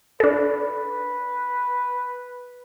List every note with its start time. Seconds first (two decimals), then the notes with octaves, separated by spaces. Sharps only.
0.20 D4 A4 B4